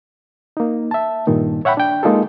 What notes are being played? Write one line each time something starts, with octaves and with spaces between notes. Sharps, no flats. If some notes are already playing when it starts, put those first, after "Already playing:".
A#3 D#4
E5 A5
G2 A#2 D#3 D#4
C#5 E5 F#5 G5 B5
D4 G5
G#3 A#3 D#4 F4 G#4 A4